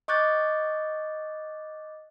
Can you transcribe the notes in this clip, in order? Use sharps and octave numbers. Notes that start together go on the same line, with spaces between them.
D#5 C#6 D6 F#6 G6 A6